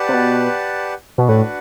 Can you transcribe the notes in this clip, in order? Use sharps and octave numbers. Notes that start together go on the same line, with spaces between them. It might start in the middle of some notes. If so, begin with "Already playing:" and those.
Already playing: G4 B4 D5 F#5 A5
C3
B2
B2
A2 D4 F#4 B4 F#5